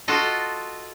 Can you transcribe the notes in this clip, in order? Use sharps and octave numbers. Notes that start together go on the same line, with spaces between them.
F4 F#4 A4 D#5